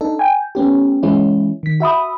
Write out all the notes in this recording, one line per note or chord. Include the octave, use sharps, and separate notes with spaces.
D4 D#4 A4
G5 G#5
A3 B3 C#4 G4
E3 G#3 C#4 E4
D#3 B6
F#4 E5 B5 D#6